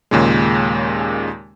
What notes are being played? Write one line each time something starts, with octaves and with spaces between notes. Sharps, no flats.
D#2 A#2 C#3 G#3